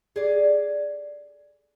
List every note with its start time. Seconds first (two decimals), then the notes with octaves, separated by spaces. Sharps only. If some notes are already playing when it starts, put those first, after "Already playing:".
0.16 G#4 D5